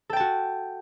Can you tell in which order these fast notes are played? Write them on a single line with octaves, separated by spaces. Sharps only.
A4 G5 A5 F#4